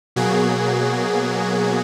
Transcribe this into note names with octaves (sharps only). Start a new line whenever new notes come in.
B2 F#3 A#3 F#4 G#4